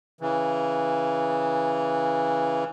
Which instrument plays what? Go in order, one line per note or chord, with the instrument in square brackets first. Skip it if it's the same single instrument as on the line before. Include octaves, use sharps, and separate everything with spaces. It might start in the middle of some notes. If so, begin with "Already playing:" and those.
[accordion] C#3 E3